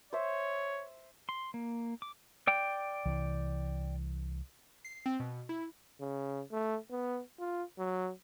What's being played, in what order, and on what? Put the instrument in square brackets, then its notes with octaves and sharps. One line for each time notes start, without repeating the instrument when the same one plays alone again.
[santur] C5 E5 [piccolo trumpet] C#5
[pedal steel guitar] C6
A#3
D6
[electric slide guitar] D5 G5
[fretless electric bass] C2 E3
[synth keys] C7
C4
B2
E4
[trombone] C#3
A3
B3
F4
F#3